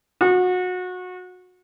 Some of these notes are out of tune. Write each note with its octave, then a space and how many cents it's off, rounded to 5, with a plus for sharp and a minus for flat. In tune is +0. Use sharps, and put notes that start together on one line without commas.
F#4 -25